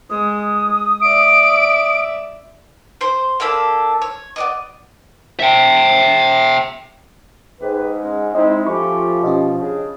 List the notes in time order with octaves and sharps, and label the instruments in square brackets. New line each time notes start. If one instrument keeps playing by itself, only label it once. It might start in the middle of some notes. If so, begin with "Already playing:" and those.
[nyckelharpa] G#3 [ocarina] D#6
[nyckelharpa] D5 E5 [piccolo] D7
[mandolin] C5 C6
A#3 D4 A4 B5
C#5
B3 D5 D#5
[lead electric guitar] E5 G5
[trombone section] G#2 [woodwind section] G4 G#4 B4
[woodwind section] G#3 C#4
[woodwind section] G#3 [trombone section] C4 D#4 E4 [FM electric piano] D#5
[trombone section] F3 [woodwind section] A3 C#4 G4 [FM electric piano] B5 C#6
[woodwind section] B2 [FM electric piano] C#4 G4 D#5
[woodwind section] C#3 D4 G#4